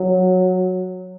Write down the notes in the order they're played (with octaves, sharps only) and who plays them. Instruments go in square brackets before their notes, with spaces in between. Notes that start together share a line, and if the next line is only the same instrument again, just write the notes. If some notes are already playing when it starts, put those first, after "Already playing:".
Already playing: [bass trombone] F#3